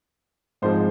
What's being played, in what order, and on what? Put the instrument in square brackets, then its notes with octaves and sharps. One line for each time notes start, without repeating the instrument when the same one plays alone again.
[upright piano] G#1 G#2 F3 G#3 C5